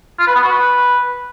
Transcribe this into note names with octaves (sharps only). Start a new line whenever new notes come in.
F4
B4
B3
F#4
B4